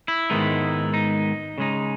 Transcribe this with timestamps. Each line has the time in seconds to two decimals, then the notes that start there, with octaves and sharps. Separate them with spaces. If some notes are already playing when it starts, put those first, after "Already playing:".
0.08 E4
0.30 G#2 D#3 G#3 B3 D#4
0.94 D#4
1.58 C#3 G#3 D#4